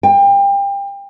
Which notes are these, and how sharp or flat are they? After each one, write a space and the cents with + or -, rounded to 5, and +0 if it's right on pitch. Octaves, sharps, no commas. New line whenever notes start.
G5 +30